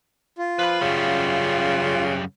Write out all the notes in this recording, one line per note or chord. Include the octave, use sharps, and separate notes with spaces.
F4
F3 B4 B5
F#2 C#3 G3